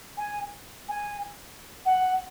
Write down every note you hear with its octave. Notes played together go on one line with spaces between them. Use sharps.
G#5
G#5
F#5